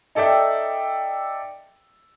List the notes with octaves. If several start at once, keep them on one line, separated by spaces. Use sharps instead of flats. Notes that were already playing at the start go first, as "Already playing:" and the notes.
D#4 A4 D5 E5 G5